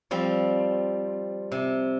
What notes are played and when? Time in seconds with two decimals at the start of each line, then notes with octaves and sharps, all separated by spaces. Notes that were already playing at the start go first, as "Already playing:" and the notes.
0.11 F3 G3 C4
1.52 C3